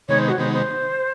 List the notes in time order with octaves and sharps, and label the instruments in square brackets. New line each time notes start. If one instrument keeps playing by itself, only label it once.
[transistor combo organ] C3 D#3 G#3 B3 D#4 [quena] C#5
[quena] C5
F#4
[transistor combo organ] C3 D#3 G#3 B3 D#4 [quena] C5
[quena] C5